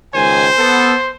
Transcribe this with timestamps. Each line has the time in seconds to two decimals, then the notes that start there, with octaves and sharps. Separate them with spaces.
0.14 C#2 D#3 C5 G#5
0.58 B3 A4